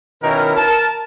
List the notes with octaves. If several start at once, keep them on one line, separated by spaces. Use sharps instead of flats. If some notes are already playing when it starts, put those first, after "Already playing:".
B2 D#3 C#4 E4 A#4
A#4 A5